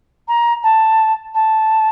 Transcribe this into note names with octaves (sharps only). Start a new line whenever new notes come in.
A#5
A5
A5